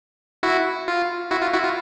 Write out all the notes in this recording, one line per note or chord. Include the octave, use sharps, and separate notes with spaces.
E4 F#4
F4
E4 F#4
F4
E4 F#4
F4